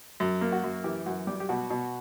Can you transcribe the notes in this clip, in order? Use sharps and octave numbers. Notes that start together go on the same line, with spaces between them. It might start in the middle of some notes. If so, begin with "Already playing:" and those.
F#2
A#3
F#4
F#2
E3 G4
F#2 F#4
G3 G4
G4
B2 F#4
B2